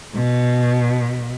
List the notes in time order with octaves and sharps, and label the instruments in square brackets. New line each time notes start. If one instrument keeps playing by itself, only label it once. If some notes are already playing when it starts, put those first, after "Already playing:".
[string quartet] B2